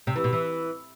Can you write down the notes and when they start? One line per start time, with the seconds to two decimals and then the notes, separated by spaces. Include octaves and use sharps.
0.07 C3
0.16 E3
0.24 B2
0.33 E3